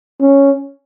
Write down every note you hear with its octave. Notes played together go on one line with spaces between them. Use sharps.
C#4